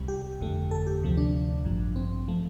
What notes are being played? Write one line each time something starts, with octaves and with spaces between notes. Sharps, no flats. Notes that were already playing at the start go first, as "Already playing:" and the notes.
Already playing: C2 C3 G3
G4
G1 F2 D3 A3
A4
G4
D2 C3 F3 A3
D4
A1 G2 F3
C4
F3 A3